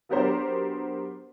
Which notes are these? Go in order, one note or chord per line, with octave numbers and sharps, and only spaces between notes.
F#3 B3 D4 G4 A#4 C5